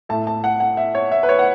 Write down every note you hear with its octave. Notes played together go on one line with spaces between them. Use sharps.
A2 A3 A5
A5
F#5
F#5
E5
C#5
E5
B4
C#5
F#5